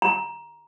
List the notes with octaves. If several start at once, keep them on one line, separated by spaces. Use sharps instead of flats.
A#5